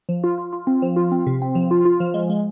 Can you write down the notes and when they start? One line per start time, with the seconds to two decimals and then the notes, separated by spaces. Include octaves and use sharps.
0.09 F3
0.24 F4
0.38 F4
0.53 F4
0.67 C4
0.82 F3
0.96 F4
1.12 C4
1.27 C3
1.42 C4
1.55 F3
1.71 F4
1.85 F4
2.00 F3
2.14 G#3
2.30 G#3